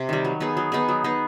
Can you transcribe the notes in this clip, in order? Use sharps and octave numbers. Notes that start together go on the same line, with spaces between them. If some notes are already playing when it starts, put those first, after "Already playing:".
Already playing: C3
D#3 G3
F#3
B3 D#4 G#4
F#3
B3 D#4 G#4
F#3
B3 D#4 G#4